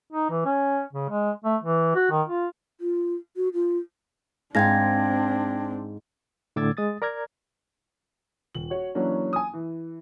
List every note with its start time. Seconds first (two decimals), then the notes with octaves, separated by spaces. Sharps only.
0.13 D#4
0.30 E3
0.45 C#4
0.93 C#3
1.09 G#3
1.44 A3
1.64 E3
1.95 F#4
2.11 D#3
2.28 F4
2.81 F4
3.36 F#4
3.54 F4
4.55 G#2 C4 D4 G#4 F5 G5 G#6 A#6
6.56 A2 D3 D6 E6 G#6 A6
6.77 G#3 D#6 A6
7.02 A#4 D5 A#5 F6 G#6
8.55 D#1 F#7
8.70 F#4 C#5
8.95 E3 F#3 A#3 C#4 D4
9.33 G#5 D#6
9.54 E3